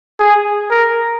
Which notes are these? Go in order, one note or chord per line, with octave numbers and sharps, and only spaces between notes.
G#4
A#4